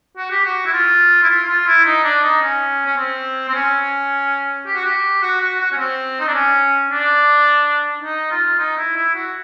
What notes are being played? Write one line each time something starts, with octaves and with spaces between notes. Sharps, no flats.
F#4
G4
F#4
E4
F4
E4
F4
F4
E4
D#4
D4
D#4
C#4
C#4
C4
C4
C#4
G4
F#4
G4
F#4
F#4
F#4
C#4
C4
D#4
D4
C#4
D4
D#4
F4
D#4
E4
E4
F#4